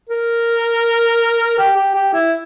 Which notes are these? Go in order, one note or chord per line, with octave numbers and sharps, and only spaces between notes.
A#4
G4
G4
G4
E4